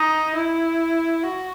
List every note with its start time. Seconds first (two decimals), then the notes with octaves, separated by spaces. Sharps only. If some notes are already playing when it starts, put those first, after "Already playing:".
Already playing: D#4
0.35 E4
1.23 F#4